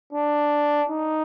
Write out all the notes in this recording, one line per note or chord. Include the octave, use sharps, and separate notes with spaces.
D4
D#4